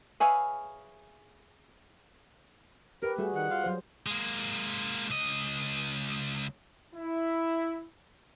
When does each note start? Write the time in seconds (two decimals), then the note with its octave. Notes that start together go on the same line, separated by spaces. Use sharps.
0.20 G#4 B4 C#5 E5 F5
3.03 G4 A#4 B4
3.18 G3 A3 F#4 G#4
3.34 D#3 F#5
3.50 F4
3.64 F#3 C5
4.06 G#3 A#3
5.10 C#2 D#5
6.94 E4